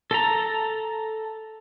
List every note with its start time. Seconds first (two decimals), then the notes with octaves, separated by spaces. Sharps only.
0.11 A4 A5 A#5